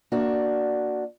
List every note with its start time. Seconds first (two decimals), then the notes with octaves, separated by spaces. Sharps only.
0.12 A#3 D4 F#4